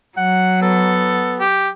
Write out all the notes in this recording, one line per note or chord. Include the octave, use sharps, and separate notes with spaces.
F#3 F#5
B3 A4
G4